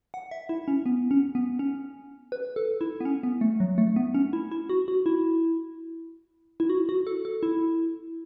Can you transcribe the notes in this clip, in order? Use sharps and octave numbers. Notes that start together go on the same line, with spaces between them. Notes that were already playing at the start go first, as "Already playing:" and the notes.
F#5
E5
E4
C#4
B3
C#4
B3
C#4
B4
A4
E4
B3
C#4
B3
A3
F#3
A3
B3
C#4
E4
E4
F#4
F#4
E4
E4
F#4
F#4
A4
A4
E4